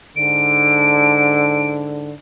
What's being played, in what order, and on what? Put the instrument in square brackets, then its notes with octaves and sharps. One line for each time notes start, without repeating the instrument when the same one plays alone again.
[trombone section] G#2 D3 [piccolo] D7